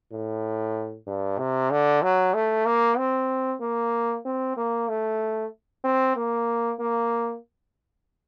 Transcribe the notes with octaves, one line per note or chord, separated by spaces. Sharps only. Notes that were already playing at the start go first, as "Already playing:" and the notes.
A2
G2
C3
D3
F#3
A3
A#3
C4
A#3
C4
A#3
A3
C4
A#3
A#3